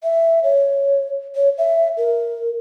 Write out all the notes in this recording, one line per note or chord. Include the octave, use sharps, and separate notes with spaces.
E5
C#5
C#5
E5
A#4